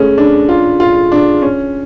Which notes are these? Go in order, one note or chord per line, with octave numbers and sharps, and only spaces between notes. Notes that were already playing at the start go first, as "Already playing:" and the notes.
Already playing: G#3 A3 C#4
D4
F4
F4
D4
C#4